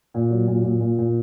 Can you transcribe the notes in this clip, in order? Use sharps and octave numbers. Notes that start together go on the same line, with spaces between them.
A#2
F#3
A#2
A#2
A#2
A#2